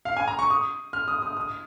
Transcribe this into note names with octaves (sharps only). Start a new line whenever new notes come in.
F5
G#5
A#5
C#6
D#6
F6
D#6
D#6
D#6